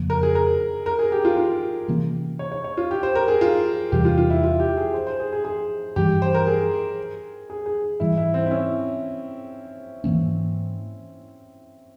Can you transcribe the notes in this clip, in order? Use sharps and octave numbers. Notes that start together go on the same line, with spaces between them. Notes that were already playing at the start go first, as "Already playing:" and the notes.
Already playing: F2 C#3 F3 A#3
A#4
G#4
A#4
A#4
G#4
G4
F4
F4
C3 E3 A#3 C#4
C#5
C#5
C#5
F4
G4
C5
A#4
G#4
F4
E2 C3 E3 G3 G4
F4
F4
E4
F4
G4
G#4
C5
C5
G#4
G#4
G#4
G2 E3 G3 G4
C5
A#4
G#4
G#4
G#4
G#2 E3 G3 E4
E4
C4
E4
C#4
G#2 E3 A#3 C#4